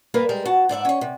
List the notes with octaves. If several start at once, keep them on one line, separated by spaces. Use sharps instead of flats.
G2 A#3 A#4 B4 D5
G3 G#3 A#4
F#4 A5
G#2 D5 E5 F#5
C#4 C#5
C3